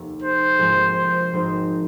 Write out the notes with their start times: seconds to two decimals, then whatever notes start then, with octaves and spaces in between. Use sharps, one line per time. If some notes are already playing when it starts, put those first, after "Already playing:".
Already playing: F1 D#2 D#3 A#3
0.22 C5
0.59 G#1 G#2 F3 A#3 G#4
0.96 C5
1.33 G#1 G#2 F3 C4 D#4